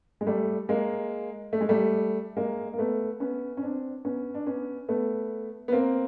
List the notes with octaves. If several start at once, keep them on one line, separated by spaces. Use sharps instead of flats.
G#3
G3 A3
G#3 A#3
A3
G#3
G3 A3
G#3 A#3
A#3
A3 B3
B3 C#4
C#4
C4 D4
B3 C#4
D4
B3 C#4
A3 B3
B3
A#3 C4